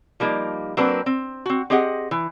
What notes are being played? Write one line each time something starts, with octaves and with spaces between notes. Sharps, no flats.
F3 G3 A#3 D#4
F#3 A#3 C4 D4 A#4 B4
C4
C4 F#4
C4 G4 G#4 D#5 F#5
E3